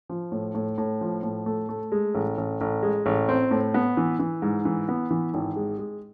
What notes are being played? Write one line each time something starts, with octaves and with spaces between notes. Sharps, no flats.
F3
A2
A2
A2
F3
A2
A3
A3
G#3
A1
A1
A1
G#3
A1
C4
A2
B3
E3
E3
G#2
E3
B3
E3
G#1
G#3
G#3